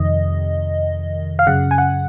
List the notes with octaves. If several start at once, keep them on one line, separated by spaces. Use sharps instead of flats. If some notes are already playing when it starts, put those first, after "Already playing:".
Already playing: F2 C3 D#3 D#5
F5
F#2 C#3 F#5
G#5
F#5